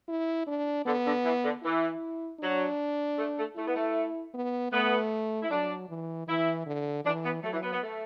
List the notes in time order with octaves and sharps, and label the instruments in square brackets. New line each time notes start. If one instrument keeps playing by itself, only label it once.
[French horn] E4
D4
[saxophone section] D3 [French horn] B3
[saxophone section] D3
E3
D3
[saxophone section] E3 [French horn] E4
[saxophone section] F#3 [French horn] D4
[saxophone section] A3
A3
[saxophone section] A3 [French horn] E4
[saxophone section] B3
A3
[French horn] B3
[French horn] A3 [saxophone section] B3
[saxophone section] E4
[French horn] F#3 [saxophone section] D4
[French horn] E3
[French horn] E3 [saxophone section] E4
[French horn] D3
[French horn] E3 [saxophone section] D4
[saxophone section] B3
[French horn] F#3 [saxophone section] A3
[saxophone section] E3
B3
B3
A3